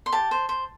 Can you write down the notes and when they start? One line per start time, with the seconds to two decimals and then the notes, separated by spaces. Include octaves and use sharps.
0.06 C6
0.12 G4 A5
0.31 C5
0.49 C5